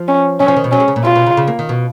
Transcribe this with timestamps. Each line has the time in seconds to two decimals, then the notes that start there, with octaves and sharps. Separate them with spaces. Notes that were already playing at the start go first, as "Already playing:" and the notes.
Already playing: F3
0.08 C#4
0.40 F#3 C#4
0.48 F3
0.57 D#3
0.64 B2
0.72 F#3 C#4
0.80 G#3
0.88 C#3
0.96 A#2
1.05 B2 F4
1.15 B2
1.26 C#3
1.37 C#3
1.48 A#3
1.59 D#3
1.69 B2